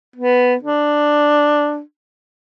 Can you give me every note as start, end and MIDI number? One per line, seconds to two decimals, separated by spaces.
0.16 0.55 59
0.63 1.81 62